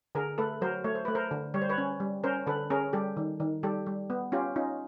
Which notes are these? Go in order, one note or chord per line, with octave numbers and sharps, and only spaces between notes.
D3 G#4 A#4
A3 A4 B4
F#3 A#4 C5
A3 C#5
C5
A3 B4
A#4 C5
D3
G3 C#5
C5
B4 C#5
C#4
G3
C#4 A#4 C5
D3 A4 B4
C#4 G#4 A#4
G3 G4 A4
D#3
D#3
G3 G4 A4
G3
B3
C#4 F4 G4
C#4 D#4 F4